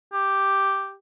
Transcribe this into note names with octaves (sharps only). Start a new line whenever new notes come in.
G4